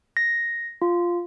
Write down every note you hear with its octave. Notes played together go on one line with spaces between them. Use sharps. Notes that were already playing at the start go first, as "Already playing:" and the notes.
A#6
F4